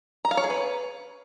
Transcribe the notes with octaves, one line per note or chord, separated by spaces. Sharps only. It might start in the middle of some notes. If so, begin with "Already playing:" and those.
A#5
F5
C#5
G#4
B4